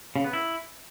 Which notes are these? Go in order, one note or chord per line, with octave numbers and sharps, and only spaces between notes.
C#3
B3
E4